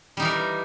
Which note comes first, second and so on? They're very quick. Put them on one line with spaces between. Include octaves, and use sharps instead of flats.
G3 D#4 E3 A#4